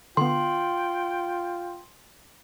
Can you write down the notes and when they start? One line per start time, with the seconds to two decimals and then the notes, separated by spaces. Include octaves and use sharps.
0.17 D3 B3 F4 G5 C6